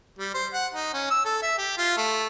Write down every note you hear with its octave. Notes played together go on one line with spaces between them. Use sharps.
G3
C5
F#5
D#4
C#4
E6
A4
E5
G4
F4
A3